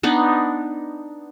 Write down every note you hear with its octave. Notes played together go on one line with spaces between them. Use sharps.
B3 D4 D#4